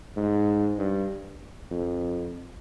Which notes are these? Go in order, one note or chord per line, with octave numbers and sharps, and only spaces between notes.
G#2
G2
F2